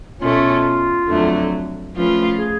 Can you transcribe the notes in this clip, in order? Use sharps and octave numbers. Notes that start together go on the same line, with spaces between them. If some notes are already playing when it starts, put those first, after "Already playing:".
B2 A3 C#4 F4
F2 D3 F#3 A3
F3 A3 C#4 F4 B4
G#4